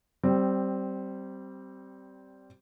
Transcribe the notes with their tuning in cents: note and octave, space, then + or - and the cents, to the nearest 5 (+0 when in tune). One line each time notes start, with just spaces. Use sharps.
G3 -15 C4 +0